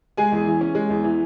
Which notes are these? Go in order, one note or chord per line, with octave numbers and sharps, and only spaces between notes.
G#3 G#4 G#5
E2
E3
C#4
G#3
E2
E3